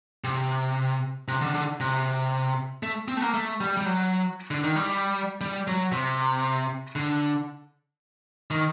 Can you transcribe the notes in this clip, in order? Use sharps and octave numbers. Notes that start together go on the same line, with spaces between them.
C3
C3
D3
D3
C3
A3
C4
A3
A#3
A3
G3
G3
F#3
D3
D#3
G3
G3
F#3
C3
D3
D#3